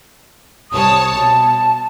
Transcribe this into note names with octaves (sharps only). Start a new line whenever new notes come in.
C2 C#5 A5 D#6
B2 A5